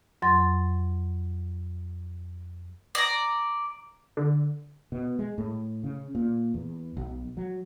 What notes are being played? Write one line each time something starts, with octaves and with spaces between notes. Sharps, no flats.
F2 F#3 C6 A6
D5 A#5
D3
B2
G#3
A2
C#3
A#2
E2
B1
F#3